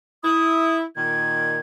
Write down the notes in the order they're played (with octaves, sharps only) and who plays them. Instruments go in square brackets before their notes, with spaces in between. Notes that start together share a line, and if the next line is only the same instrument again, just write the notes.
[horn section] E4 [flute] D#6
[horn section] A#2 D#3 [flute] G#6